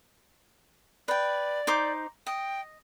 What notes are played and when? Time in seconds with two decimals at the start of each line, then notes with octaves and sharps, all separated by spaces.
1.08 B4 D5 G5
1.67 D#4 C5 D6
2.27 D#5 G5